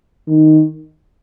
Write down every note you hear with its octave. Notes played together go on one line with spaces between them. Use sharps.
D#3